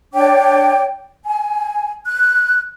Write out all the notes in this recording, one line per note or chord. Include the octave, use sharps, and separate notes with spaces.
D4 C#5 G5 D6
G#5
F#6